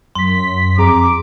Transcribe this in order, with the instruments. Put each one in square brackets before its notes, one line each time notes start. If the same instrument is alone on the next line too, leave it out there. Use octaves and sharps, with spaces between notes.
[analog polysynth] F#2 B6 [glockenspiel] C6
[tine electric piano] F2 G#4 A#5 [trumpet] D6